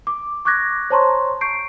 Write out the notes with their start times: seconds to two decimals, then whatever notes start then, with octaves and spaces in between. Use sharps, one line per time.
0.07 D6
0.45 C#6 D6 F#6 G#6 A#6
0.90 C5 C#5 A5 A#5 C6 C#6
1.41 C#6 G6 C7 D7